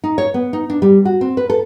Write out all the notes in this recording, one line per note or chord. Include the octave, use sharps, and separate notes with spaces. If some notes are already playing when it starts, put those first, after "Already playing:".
D#4
C#5
B3
D#4
D4
G3
F#4
C4
B4
A4